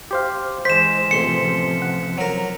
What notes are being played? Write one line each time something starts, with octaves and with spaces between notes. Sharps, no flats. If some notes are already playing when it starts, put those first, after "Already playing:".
G4 C5 F5
E3 G#3 C5 B6 E7
A1 C3 F3 C6 C#7
F#5
F#3 A#4